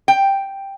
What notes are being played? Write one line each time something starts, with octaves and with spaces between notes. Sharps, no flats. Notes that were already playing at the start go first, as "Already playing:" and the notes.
G5